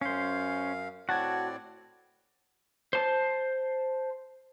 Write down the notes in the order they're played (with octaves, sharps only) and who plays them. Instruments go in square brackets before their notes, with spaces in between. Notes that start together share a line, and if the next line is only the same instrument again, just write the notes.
[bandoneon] F#2 F5 [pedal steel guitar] C#4 C5
[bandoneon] A2 C4 D5 [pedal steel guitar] F#4 A5 [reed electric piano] F#5 G#6
[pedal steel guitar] C5 A5